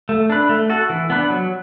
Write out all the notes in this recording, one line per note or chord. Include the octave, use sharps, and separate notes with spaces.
A3
D4 B4
A3
F#4 A4
E3
B3 D4 B4
F#3